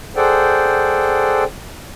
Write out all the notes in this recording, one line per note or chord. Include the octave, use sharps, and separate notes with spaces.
G#4 A4 C5 D5 F#5 G5